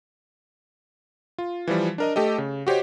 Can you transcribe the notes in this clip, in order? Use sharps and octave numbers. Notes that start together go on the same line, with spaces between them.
F4
E3 F3 G3
D4 A#4 D#5
A3 G4 A4 D#5
C#3
F#4 G4 C5 C#5 D#5